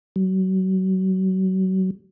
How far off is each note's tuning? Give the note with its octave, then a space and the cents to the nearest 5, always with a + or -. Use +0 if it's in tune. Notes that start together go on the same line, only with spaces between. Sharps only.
F#3 +30